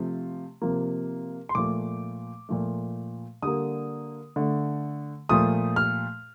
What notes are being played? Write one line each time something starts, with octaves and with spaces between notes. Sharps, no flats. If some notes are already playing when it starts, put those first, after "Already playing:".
Already playing: C3 F3 A3
C3 F3 A#3
C6
A#2 F3 A3 D6
A#2 F3 A3
D3 G3 A#3 D#6
D3 A3
A#2 F3 A3 D#6
F6